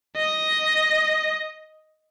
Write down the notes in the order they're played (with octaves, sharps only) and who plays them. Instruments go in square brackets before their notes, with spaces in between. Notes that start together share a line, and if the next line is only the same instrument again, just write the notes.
[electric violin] D#5